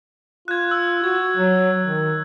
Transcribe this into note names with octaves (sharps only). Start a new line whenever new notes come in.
F4 F#6 G#6
E6
F#4 G#6
F#3
D#3